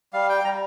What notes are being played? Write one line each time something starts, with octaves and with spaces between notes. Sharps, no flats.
G3 F5
G5
G3 A#5